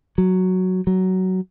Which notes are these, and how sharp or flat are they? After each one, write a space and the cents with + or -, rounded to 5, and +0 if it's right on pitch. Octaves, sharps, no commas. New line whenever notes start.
F#3 +0
F#3 +15